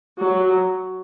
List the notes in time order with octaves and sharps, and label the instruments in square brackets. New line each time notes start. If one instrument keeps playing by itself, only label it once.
[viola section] F#3